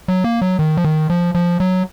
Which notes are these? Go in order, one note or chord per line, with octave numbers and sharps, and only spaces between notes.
F#3
A#3
F#3
D#3
F3
D#3
F3
F3
F#3